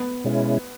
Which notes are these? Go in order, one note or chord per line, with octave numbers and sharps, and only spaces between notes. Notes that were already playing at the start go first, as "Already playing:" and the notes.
Already playing: B3
B2 G#3 C#4 E4